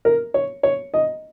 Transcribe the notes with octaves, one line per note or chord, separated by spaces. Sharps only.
A#4
C#5
C#5
D#5